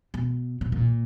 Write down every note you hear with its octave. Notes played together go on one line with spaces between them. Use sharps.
B2
B2
A#2